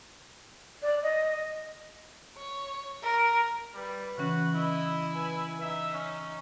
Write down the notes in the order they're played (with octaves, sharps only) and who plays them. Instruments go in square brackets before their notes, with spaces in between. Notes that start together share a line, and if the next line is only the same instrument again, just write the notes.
[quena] D5
D#5
[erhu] C#5
A#4
[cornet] G3 [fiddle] B4
[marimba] C#3 E3 C#4 [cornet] F#4
[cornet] E4 [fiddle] D#5
[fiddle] B4 G#5
[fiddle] D#4 [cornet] E5
[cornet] C#4